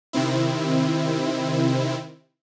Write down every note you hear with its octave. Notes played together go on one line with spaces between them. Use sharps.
C3 D#3 C4 E4